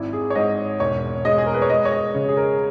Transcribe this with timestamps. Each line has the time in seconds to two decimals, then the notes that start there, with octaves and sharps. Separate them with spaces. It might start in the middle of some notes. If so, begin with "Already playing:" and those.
Already playing: G#1 E4
0.13 G#4
0.30 C#5
0.35 G#2 D#5
0.80 E1 C#5
1.25 G#3 D#5
1.38 G#4
1.46 A#4
1.54 B4
1.62 C#5
1.70 G#3 D#5
1.85 C#5
1.92 D#5
2.14 C#3
2.29 G#4
2.37 A#4